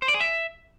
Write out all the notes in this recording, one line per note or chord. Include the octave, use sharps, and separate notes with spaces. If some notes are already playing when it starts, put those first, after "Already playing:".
C5
D5
G#4
E5